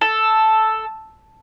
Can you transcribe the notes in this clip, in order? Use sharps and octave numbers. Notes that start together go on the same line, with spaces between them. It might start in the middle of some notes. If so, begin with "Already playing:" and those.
A4